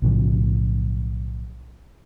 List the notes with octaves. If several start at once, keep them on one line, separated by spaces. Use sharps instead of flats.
B1 A2 C#3 F3